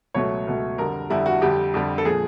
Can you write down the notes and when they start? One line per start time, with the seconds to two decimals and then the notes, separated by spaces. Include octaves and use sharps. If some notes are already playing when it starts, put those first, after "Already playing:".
0.14 C#2 B2 F#3 A3 C#5
0.47 C#2 B2 F#3 A3
0.78 F2 D3 G3 A#4
1.10 F2 D3 G3 E4
1.26 F#4
1.41 F2 D3 G3 G4
1.74 F2 D3 G3
1.98 A4
2.05 A#2 F3 G#3 G#4